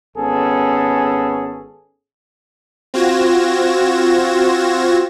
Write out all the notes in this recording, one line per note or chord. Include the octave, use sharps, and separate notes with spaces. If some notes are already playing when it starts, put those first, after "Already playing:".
G#1 B3 C#4 G#4 A4
C4 F4 F#4 G#6 A#6 E7